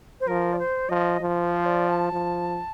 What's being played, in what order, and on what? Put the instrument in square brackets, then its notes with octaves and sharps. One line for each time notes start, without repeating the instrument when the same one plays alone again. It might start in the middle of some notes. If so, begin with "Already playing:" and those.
[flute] C5
[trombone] F3 [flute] A#4
[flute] D5
C5
[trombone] F3 [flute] D#5
[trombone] F3
[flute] C5
D5
A5
[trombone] F3